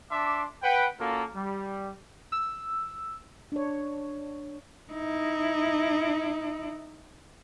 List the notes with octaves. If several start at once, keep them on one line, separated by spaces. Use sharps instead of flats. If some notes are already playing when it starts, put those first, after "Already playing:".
D4 E5 A5 C6 D6
B4 F#5 G5
A#3 C#4 F4 F#4 A4 A#4
G3
E6
D4 C#5
D#4 E4